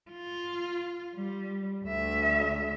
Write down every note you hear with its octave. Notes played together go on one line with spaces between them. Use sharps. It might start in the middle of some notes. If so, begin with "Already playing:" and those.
F4
G3
D2 E5